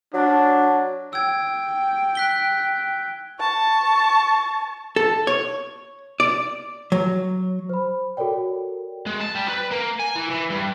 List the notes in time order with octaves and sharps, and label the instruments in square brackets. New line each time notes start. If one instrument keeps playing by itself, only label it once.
[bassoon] F#3 [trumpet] D4
[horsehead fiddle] G5 [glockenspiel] E6 G#6
[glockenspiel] F#6 B6 G7
[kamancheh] A5 C#6
[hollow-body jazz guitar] A4
C#5
D5
F#3
[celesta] C5 B5
F#4 A4 A#4 C#5 D5 G5
[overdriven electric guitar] G#3
A5
G3
B4
A#3
G#5
E3
E3
G2